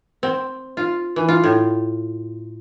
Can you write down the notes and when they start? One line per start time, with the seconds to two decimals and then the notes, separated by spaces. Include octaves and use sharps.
0.23 C4
0.77 F4
1.16 E3
1.28 F4
1.44 A2